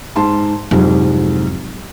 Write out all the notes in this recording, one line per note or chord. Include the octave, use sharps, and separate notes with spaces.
G#2 A5 C6
C2 F2 G#2 F#3